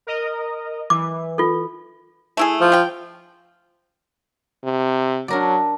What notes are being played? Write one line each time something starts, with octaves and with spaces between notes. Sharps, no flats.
A#4 D#5
E3 D6
F4 A4
A3 E4 G#4
F3
G5
C3
F#3 D4 A#4 D5